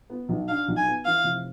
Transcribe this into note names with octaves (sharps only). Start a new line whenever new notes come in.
B3
B1
D4 F5
B1
G#5
B3
E3 F5
F1